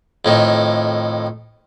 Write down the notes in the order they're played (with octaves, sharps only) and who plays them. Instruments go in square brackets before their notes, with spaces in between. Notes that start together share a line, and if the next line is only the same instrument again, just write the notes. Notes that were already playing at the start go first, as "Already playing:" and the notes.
[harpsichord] F2 A2 D#3